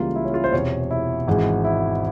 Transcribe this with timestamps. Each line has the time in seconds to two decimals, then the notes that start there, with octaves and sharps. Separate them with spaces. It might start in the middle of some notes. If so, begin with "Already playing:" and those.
Already playing: C#2 C#3 E3 G3 A#3 F4
0.16 E4
0.25 C#4
0.34 F4
0.44 C5
0.52 E1 E2 C3 C#5
0.91 E4
1.28 G#1 G#2 E3 G#3
1.64 E4